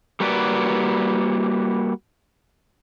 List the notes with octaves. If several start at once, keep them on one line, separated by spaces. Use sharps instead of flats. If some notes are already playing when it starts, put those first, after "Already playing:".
G3 A#3 F#4 B4 D5